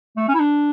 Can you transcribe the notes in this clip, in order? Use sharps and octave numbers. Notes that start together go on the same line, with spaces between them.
A3
C#4
E4
D4